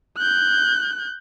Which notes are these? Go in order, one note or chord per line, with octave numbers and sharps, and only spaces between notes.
F#6 G6